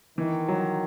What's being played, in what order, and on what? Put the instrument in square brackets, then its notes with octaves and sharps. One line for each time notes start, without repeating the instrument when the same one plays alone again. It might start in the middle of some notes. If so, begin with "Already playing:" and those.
[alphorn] D#3 [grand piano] E3
[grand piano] F#3